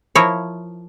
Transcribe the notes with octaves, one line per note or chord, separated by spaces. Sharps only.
F3 E4 A#4 C#5